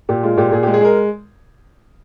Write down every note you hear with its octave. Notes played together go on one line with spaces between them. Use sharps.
A#2 G4
G#3 F4
A#2 G4
A#2 G#4
G#3 G4
G#4
G#3 A#4